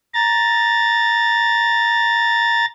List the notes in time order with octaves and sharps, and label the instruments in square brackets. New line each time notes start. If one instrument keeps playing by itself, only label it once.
[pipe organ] A#5 A6